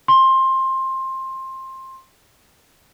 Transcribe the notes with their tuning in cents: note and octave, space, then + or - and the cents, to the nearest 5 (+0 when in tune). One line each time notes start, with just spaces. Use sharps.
C6 +20